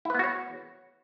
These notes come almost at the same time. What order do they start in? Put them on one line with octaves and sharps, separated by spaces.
E4 B4 B3 F#4 C#5